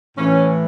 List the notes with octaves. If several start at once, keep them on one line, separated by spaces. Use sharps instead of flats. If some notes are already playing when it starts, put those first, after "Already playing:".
A2 E3 C#4